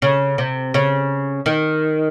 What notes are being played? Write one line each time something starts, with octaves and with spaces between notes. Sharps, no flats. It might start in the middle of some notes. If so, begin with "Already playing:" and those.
C#3
C3
C#3
D#3